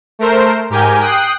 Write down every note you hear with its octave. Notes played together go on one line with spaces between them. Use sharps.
A3 A#4 C5
G#2 G4 A#4 G#5 G6
G5 D#6 F#6 C7